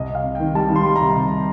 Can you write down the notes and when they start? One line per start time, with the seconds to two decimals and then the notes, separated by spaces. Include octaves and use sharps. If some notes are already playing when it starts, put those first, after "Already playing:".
Already playing: C2 D#5
0.09 C3
0.15 F5
0.24 C3
0.35 D#3 G5
0.55 G3 A5
0.70 D#3
0.76 C6
0.85 G3
0.96 A#5
1.01 C3
1.16 C3
1.31 C3